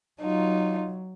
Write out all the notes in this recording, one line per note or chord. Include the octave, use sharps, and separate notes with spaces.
F#3 D#4 F4